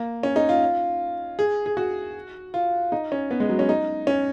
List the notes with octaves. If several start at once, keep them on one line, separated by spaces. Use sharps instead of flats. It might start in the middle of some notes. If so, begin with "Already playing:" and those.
Already playing: A#3
C#4
D#4
F4
G#4
G#4
F#4
F4
D#4
C#4
B3
G#3
F#3
C#4
D#4
C#4